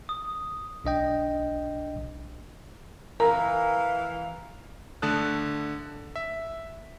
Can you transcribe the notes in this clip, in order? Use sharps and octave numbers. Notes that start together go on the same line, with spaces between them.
D#6
B1 D4 D#5 G5
E3 A#4 F5 A#5
D3 A3 A5 D#6 F#6
E5